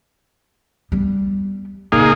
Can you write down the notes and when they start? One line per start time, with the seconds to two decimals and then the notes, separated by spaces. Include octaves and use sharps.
0.92 G3 B3
1.92 F#1 A#2 A#3 D#4 G#4